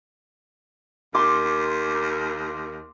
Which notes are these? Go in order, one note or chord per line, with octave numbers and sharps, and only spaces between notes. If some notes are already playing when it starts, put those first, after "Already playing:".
D#2 C6 D6